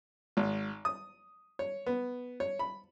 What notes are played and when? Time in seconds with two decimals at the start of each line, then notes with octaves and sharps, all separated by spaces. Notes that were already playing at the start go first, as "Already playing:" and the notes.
0.37 G#1
0.85 D#6
1.59 C#5
1.86 B3
2.40 C#5
2.59 B5